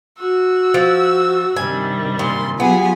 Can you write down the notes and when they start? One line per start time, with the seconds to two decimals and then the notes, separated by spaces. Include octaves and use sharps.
0.19 F#4 E6
0.74 F3
1.56 G2 C3 D#3 G3 G#5
2.19 A#2 C6
2.60 F#3 B3 F4 G4 G#4 G#5